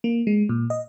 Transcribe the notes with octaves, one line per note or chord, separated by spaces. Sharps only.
A#3
G#3
A#2
D#5